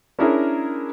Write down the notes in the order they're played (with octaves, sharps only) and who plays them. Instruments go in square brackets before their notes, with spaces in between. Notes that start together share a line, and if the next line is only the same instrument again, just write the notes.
[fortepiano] C#4 D4 E4 G#4 A#4 C#5